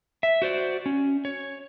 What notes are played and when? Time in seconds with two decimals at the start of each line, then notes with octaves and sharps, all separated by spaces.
0.23 E5
0.42 F#4 C5 D5
0.86 C#4
1.25 C#5